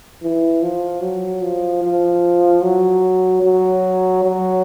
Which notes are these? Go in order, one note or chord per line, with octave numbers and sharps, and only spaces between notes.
E3
F3
F#3
F3
F3
F#3
F#3
F#3